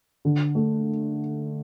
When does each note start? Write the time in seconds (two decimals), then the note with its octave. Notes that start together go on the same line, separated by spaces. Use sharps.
0.25 D3
0.55 A3